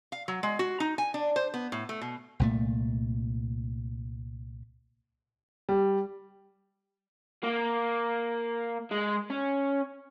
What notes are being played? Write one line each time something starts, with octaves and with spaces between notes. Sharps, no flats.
F5
F#3
G#3
F#4
D#4
G#5
D4
C5
B3
A2
A3
B2
C2 A#2 A3
G3
A#3
G#3
C#4